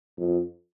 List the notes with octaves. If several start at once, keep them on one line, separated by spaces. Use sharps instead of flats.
F2